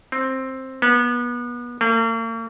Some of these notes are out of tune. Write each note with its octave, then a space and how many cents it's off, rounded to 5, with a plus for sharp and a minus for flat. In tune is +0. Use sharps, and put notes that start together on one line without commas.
C4 +10
B3 -30
A#3 -45